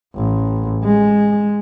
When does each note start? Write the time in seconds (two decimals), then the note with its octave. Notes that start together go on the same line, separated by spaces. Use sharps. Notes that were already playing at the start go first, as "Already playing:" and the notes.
0.15 A1
0.84 G#3